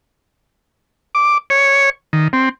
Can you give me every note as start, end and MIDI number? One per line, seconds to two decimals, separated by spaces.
1.15 1.38 86
1.50 1.90 73
2.13 2.28 51
2.33 2.49 60